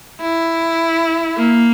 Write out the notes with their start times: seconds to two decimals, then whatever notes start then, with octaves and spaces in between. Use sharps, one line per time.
0.21 E4
1.37 A#3